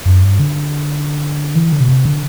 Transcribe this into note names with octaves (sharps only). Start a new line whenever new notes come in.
F#2
G2
D3
E3
D3
B2
C3
D3